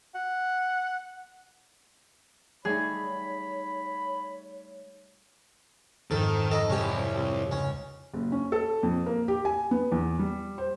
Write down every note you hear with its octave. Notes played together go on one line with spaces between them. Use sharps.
F#5
G3 A3 D#4 G#4 C#5 B5
F2 G#2 D#3 A4
A4 D#5 A#6
C2 C#4 G4
C#2 C#4
F#1
C#4
A4
F2
A#3
G4
G#5
B3
E2
G3
C5